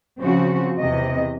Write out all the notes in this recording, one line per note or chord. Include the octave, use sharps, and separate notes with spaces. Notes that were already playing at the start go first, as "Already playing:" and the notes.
C#3 F3 C4 F#4
E2 C3 D#5